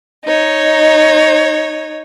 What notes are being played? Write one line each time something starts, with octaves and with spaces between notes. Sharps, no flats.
D#4 C#5